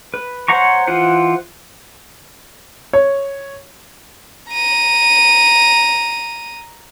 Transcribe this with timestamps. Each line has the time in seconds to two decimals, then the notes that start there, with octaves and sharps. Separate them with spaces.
0.14 B4
0.48 C5 C#5 F#5 A#5 C#6
0.87 E3 F4 C5 F#5
2.93 C#5
4.51 A#5 D#7